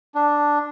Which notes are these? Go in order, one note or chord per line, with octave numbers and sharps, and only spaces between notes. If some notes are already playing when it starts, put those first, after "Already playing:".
D4